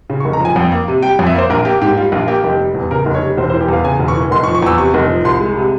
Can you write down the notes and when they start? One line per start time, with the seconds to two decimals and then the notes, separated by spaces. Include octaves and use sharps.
0.10 C#3
0.20 C#6
0.25 F1
0.33 A#5
0.40 F3 G#5
0.56 F2 G5
0.72 A#3
0.88 C3
1.03 G3 G5
1.19 F2
1.26 E5
1.35 A#3 C5
1.50 A#1 A#4
1.65 A#3 G4
1.81 G#2 G4
1.97 G3 F4
2.12 A#1 F4
2.28 A#3 G4
2.44 F1 G4
2.59 G3
2.75 E2
2.91 C#3 A#4
3.06 F1
3.14 C#5
3.22 G3
3.37 E1 C5
3.49 C5
3.54 E3
3.61 G4
3.69 E2 F5
3.84 C#3 G#5
4.00 E1
4.08 C#6
4.16 E3
4.31 F1 C6
4.44 C#6
4.47 F3
4.55 C#6
4.62 E2 E6
4.78 C3 C#6
4.94 F1
5.09 F3
5.25 C2 C6
5.41 G#3
5.57 C3